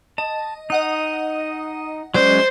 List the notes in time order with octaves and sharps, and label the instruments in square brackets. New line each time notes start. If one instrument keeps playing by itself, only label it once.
[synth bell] D#5 [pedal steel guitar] A5
[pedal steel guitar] D#4 [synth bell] D#5 F#5 D#6
[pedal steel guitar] F#3 G#3 C#4 [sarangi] C5 [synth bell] D5